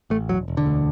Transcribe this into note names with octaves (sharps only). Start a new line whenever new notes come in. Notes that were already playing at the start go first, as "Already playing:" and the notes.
A1 A3
E1 F#3
E1
D3
D2